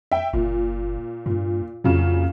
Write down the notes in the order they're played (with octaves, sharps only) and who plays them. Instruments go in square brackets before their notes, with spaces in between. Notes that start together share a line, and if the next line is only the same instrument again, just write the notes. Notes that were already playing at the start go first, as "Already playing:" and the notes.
[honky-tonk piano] E5 G5
[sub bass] F#1 [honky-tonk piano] A#2
[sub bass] G2 [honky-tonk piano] A#2
[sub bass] F2 [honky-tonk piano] A#2 C#3 F#3